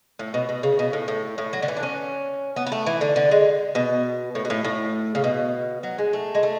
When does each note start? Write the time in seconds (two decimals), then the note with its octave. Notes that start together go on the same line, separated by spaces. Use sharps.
0.19 A2
0.34 B2
0.49 B2
0.63 C#3
0.79 B2
0.93 A2
1.08 A2
1.38 A2
1.53 F#3
1.62 D3
1.68 E3
1.76 D4
1.83 C#4
2.56 B3
2.66 B3
2.72 A3
2.86 E3
3.01 D3
3.16 D3
3.31 G#3
3.75 B2
4.35 A2
4.45 B2
4.50 A2
4.64 A2
5.15 C#3
5.24 B2
5.83 F#3
5.98 G#3
6.13 A3
6.35 G#3
6.43 A3